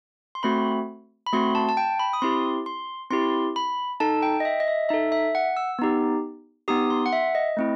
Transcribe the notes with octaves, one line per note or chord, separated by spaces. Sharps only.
C6
A3 C4 F#4 B5
B5
A3 C4 F#4 C6
A5
A5
G5
B5
D#6
C4 E4 G4 C6
C6
C4 E4 G4 C6
B5
D#4 A4 A5
G5
D#5
E5
D#5
E5
D#4 A4 E5
E5
F#5
E6
B3 D#4 G4
B3 D#4 G4 D#6
C6
F#5
E5
D#5
A3 C4 E4